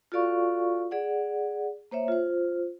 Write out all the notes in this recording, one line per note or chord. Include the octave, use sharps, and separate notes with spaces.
F4 F#4 A4 D5 F5 C#6
G#4 D5 F#5
A#3 C5 C#5 E5
F4 C5